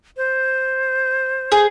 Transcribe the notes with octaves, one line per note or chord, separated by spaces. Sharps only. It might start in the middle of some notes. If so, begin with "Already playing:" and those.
C5
G#4